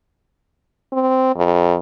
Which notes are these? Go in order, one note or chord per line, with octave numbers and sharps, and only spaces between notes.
C4
F2